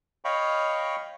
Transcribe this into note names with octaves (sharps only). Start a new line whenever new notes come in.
C#5 D#5 F5 G5 B5 C#6